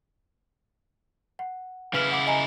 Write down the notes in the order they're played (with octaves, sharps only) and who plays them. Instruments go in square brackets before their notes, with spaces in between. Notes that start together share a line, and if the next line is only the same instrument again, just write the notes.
[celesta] F#5
[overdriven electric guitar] C#3 E4 [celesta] B4 F6
[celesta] F#5 D6
D#5 G#5 A#5